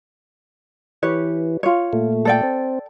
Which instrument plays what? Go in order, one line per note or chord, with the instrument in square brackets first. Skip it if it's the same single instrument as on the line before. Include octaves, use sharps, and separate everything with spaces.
[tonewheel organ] E3 [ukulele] G4 B4 C#5
[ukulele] F4 C#5
[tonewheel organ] A#2 A3
[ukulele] A4 D5 G5
[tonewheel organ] C4